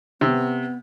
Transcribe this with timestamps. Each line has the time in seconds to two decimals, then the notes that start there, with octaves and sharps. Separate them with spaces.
0.21 C3 B3